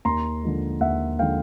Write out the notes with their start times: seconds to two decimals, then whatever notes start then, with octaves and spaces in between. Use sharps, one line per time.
0.05 D#2 A#5 C6
0.43 D3 F3 G#3
0.81 D#2 E5 F#5
1.19 D3 F3 G#3 F5 G5